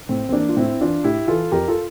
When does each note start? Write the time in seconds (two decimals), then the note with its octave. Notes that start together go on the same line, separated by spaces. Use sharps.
0.09 A2 C4
0.29 C4
0.32 E3 A#3 D4
0.49 F4
0.57 A2 C4 E4
0.81 E3 D4 F4
1.04 A2 E4 G4
1.28 E3 F4 A4
1.52 F2 G4 A#4
1.68 F4 A4